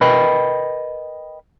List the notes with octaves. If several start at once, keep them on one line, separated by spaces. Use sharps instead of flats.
A#4 B4 D#5 G5 B5